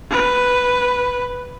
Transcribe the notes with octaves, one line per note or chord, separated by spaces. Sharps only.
B4